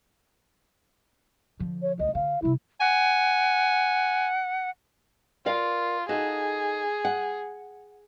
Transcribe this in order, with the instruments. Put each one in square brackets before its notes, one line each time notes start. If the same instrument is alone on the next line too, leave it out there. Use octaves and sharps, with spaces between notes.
[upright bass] D3 F3
[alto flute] C#5
[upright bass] D2 [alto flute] D#5
[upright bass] D3 [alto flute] F5
[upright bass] C3 G3 [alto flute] E4
[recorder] F#5 [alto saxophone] G#5
[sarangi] F4 [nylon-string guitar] A#4 D5 F5
[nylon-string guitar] D#4 F#4 A4 [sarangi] G#4
[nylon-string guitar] F#5